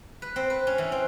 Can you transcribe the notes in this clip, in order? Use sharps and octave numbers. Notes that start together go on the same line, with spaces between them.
B4
C4
B4
C#4
E3
C4